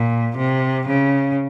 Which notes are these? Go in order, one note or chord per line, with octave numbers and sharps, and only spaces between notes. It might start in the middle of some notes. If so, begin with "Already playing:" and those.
Already playing: A#2
C3
C#3